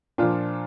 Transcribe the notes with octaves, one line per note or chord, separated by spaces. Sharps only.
A#2 F3 D4 F4